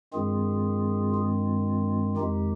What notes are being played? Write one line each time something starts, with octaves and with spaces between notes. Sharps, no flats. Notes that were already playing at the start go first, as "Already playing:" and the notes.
G2 D#3 G#3 C4 F4 G#4
F4
F2 D#3 G#3 D#4 G4